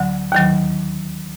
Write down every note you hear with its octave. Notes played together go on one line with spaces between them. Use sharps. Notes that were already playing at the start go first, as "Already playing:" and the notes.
Already playing: D2 D3 F#3
D#2 D#3 F#3